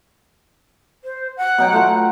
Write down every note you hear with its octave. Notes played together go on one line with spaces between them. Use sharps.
C5
F#5
B2 F#3 G5
A3 F4 A#5